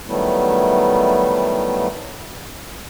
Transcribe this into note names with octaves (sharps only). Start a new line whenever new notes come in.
D#3 F#3 G3 A3 B3 E4